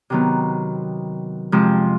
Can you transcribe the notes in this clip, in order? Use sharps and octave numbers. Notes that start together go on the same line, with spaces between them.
C3 D#3 F#3 B3
F2 C3 F3 G#3